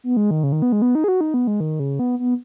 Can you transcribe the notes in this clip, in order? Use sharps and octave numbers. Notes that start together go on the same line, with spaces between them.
B3
G#3
D#3
C#3
D#3
B3
G#3
B3
D#4
G#4
F#4
D#4
B3
G#3
D#3
C#3
B3
B3